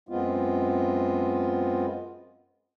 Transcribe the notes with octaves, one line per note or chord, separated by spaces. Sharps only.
F#2 G#3 B3 C4 F4